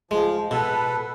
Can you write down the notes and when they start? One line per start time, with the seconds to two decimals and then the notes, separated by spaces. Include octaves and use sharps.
0.11 F3 G#3
0.51 B2 A4 B4